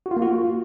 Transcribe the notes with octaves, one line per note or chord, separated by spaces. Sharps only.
F#4
F4
A#3
F#4
F4